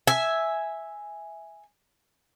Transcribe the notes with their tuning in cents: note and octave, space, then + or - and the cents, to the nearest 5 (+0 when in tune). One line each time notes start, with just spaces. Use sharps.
E5 -5 G#5 +0